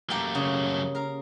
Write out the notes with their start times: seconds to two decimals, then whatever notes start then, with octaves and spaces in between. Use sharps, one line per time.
0.10 F#2 A3 A#3 G4 G5
0.35 C#3
0.95 A#4 F5